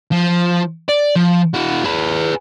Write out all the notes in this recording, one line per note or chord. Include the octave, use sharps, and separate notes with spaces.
F3
D5
F3
E4 F#4
G#4 B4